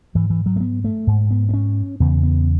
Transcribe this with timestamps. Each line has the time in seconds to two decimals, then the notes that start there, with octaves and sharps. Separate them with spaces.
0.15 G#2 E3
0.30 E3
0.46 F#3
0.56 A3
0.60 B3
0.84 A3
1.07 G#2
1.31 B3
1.49 B3
1.54 C#4
2.00 E2 C#3 B3
2.23 B3